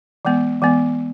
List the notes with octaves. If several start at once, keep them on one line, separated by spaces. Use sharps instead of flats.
E3 G#3 B3
E3 G#3 B3